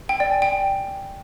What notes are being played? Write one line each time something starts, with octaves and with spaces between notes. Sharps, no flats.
G5
D5
G#5
G5